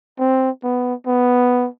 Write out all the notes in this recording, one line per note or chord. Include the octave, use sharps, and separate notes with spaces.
C4
B3
B3